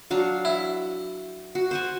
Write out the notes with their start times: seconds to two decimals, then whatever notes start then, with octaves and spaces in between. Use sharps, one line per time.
0.10 F#3 D4 F5
0.45 E4
1.55 F#4
1.71 C5 F#5 G#5